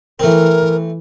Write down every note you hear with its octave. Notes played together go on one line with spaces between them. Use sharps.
E3 A3 C4 A#4